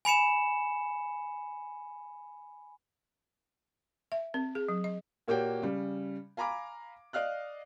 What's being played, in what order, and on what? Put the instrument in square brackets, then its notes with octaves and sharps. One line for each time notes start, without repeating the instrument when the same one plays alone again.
[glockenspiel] G#5 B5 C#7 E7
[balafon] E5
C4
G#4
F#3
D#5
[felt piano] A#2 A#3 F#4 G4 C#5 G5
C#3 G3
F5 G#5 A#5 B5 D6
D5 D#5 F5 F6 F#6